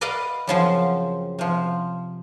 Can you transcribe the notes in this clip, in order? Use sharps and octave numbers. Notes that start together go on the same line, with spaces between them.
B4 D5 D#5 F5 A#5 B5
F#2 C#3 F3 C4
C3 F3